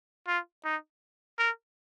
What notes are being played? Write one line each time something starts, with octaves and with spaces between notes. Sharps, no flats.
F4
D#4
A#4